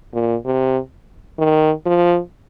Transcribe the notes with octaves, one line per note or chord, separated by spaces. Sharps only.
A#2
C3
D#3
F3